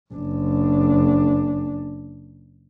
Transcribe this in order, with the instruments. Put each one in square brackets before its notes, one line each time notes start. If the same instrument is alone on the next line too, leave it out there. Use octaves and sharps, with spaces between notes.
[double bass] F#1 D4